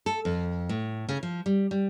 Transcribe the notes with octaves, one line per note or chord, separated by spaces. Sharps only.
A4
F2
A2
C#3
F3
G3
G3